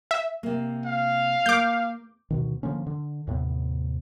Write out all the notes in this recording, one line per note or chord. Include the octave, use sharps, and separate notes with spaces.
E5
C3 A#3
F5
A#3 D6 G6
D2 B2 D#3
D3 F3 A#3 C#4
D3
D#2 A2 C3 B3